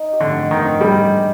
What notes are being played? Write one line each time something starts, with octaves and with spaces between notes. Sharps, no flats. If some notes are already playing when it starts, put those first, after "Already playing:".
Already playing: D#4
G4
D3
C5
D#3
D#5
G3 G#3
D4